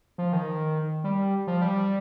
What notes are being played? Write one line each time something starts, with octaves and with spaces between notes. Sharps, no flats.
F3
D#3
G3
F3
G3